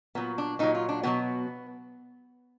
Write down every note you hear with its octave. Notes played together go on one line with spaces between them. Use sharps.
A#2 F#3 B3
D4
A#2 F#3 D#4
F4
D4
B2 F#3 B3